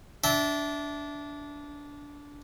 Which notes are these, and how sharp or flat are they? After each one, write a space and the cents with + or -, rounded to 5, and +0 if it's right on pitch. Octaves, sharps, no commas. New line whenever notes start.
D4 -20 E5 -10 G5 +0